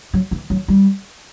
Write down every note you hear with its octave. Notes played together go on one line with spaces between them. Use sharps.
F#3
E3
F#3
G3